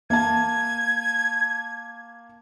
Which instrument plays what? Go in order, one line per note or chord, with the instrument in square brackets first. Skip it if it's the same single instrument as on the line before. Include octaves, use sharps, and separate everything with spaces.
[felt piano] A#3 A5 [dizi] G#6